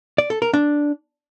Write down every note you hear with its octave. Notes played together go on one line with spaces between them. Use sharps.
D5
A4
A#4
D4